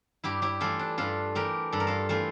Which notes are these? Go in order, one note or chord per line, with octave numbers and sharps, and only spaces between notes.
G2 E4 G4
E4 G4
E3 A3 F4 A4
D4
G2 F4 A4
E3 A3 G4 A#4
G2 A4
A#4
F4 A4
E3 A3 F4 A4